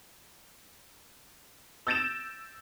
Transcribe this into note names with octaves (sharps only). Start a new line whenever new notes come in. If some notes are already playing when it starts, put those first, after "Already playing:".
E6 G6 A6 A#6 D7 E7